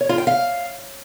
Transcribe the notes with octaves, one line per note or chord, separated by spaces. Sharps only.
C#5
F4
G5
F5